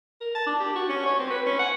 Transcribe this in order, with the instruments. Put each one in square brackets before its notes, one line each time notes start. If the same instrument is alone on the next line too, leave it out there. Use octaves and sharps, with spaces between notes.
[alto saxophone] A#4
A5
D4
G4
F#4
C#4
C#5
C4
B4
C#4
F#5